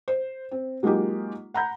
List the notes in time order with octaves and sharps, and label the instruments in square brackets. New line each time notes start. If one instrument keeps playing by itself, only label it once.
[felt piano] C5
C4
F#3 G#3 A#3 D#4 F4 G4
F#5 A#5 B5 G6